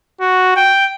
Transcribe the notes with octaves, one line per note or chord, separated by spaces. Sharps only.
F#4
G5